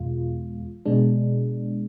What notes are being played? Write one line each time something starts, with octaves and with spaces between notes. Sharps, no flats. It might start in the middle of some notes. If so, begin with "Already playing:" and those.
Already playing: E2 B2 G#3 F4
B2 G#3 D4